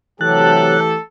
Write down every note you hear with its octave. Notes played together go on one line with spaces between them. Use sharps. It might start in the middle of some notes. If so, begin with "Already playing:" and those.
C3 E3 F#3 A3 G4 A4 A5 F#6